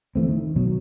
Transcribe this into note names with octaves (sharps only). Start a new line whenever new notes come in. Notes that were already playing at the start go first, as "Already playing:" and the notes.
E3 A3 C4
D#3
B2 F#3